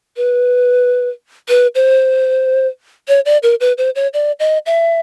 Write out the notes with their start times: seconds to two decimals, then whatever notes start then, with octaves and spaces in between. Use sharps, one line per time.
0.17 B4
1.49 B4
1.75 C5
3.08 C#5
3.25 D5
3.43 A#4
3.60 B4
3.78 C5
3.95 C#5
4.13 D5
4.40 D#5
4.66 E5